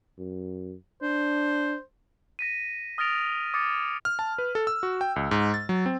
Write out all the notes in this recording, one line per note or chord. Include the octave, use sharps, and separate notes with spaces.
F#2
D4 C5
A#6 B6 D#7
D#6 F6 A6 A#6 D7 F7
D6 D#6 G#6 A6 C#7 D#7
F6
A5
B4
A4
E6
F#4
G5
C#2
G#2
A6
F#3
C4